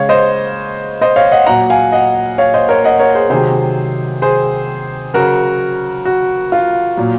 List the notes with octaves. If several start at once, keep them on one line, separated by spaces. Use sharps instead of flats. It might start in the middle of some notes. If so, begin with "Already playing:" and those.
Already playing: C#3 G#3 C#5 F5
C5 D#5
C5 D#5
C#5 F5
D#5 F#5
A#2 F#3 F#5 A#5
F5 G#5
D#5 F#5
C#5 F5
C5 D#5
A#4 C#5
D#5 F#5
A#4 C#5
G#4 C5
C3 D#3 F#3 G#4 C5
G#4 C5
C#3 F#3 F#4 A#4
F#4
F4
A#2 F#3